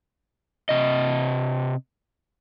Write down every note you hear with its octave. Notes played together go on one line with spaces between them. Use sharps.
C3 D#5